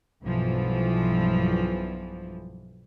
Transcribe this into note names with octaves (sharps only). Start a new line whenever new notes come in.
B1 G2 E3 F3